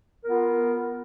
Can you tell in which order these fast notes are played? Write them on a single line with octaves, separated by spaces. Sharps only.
A#4 B3 F4